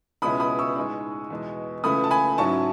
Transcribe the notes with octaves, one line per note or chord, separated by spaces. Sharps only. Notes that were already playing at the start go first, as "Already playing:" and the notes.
C#2 B2 G#3 C#4 E4 B5 D#6
B5 D#6
C#6 E6
A2 G#3 D#4
E2 B2 G#3
C#2 C#3 E3 A3 B5 D#6
A5
G#5 B5
G#2 F#3 C#4 E4 A5 C#6